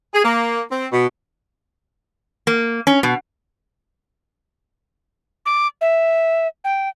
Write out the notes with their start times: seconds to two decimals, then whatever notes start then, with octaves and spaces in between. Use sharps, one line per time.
0.13 G#4
0.25 A#3
0.71 C4
0.92 B2
2.47 A#3
2.87 C#4
3.03 B2
5.46 D6
5.81 E5
6.64 G5